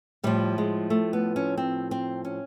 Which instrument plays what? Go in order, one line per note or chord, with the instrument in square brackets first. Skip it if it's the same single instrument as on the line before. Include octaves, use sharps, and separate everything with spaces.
[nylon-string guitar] A2 F3 G3
G#3
A3
B3
C#4
C4
C4
C#4